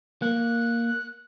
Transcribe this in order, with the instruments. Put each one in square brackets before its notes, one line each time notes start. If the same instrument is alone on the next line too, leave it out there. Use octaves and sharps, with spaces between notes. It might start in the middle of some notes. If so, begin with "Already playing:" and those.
[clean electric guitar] A#3 [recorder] F#6